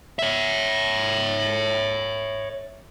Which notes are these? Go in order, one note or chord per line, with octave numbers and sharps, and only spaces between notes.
C#5 E5